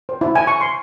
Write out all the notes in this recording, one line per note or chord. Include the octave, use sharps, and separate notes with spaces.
C5
E4
G#5
C#6
C6